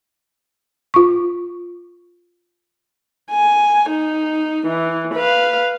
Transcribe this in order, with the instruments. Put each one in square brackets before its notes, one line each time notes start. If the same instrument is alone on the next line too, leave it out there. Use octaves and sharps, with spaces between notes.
[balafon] F4 C#6
[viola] G#5
D#4
E3
B4 F5